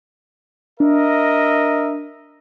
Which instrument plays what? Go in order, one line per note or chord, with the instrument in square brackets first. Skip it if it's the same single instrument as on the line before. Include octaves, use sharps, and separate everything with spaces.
[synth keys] D4 [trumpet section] A#4 D#5 E5